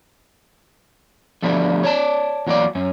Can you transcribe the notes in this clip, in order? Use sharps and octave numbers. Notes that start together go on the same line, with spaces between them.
D3 F3 G3 A3 B3 D4
C#5 D5 A5
E2 F#3 A#3 D4 D5
F#2 C#4